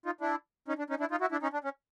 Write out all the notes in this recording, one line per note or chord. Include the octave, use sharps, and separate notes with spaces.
D#4 F4
D4 E4
C#4 D#4
D4
C#4 D#4
D4 E4
D#4 F4
E4 F#4
D4 E4
C#4 D#4
D4
C#4